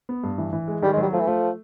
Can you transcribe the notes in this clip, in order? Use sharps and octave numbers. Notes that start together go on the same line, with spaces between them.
B3
G2
E3
E3
G#3
D#3 G3
G#3
F#3 G3
F3 A3
E3
F3 A3